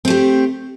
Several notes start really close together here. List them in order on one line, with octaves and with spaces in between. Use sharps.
C4 A3 G4